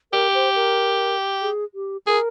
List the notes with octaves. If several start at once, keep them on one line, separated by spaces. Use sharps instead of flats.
G4 A#4
C5
A#4
G#4
G4
G#4 A#4